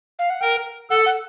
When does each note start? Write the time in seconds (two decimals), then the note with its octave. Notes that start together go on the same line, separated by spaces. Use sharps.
0.19 F5
0.30 F#5
0.41 A#4 G5
0.90 A4 F#5
1.06 F#5